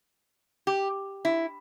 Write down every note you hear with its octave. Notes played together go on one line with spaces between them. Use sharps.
G4
E4